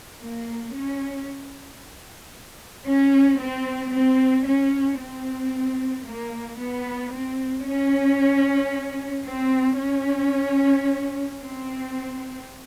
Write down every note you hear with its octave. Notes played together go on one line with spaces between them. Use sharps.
A#3
C#4
C#4
C4
C4
C#4
C4
A#3
B3
C4
C#4
C4
C#4
C4